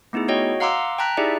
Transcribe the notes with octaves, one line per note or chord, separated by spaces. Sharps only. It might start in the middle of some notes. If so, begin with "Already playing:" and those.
A3 B3 D#4 E4 G#4
F#4 C#5 D#5 G5
F5 F#5 A#5 C6 D6 E6
G5 A5 A#5 F#6 B6
D#4 E4 G4 G#4 D5 E5